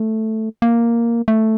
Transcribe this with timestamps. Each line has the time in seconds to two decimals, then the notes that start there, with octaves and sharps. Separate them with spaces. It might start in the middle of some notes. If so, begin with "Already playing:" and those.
Already playing: A3
0.62 A#3
1.28 A3